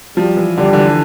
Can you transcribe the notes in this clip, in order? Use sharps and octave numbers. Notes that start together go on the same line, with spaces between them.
F3 G3
E3
D3 G3
D3
E3